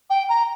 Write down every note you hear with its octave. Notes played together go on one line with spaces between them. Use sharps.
G5
A#5